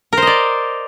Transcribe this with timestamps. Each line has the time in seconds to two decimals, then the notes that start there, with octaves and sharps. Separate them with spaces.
0.13 A#4
0.17 C5
0.22 D#5
0.27 D5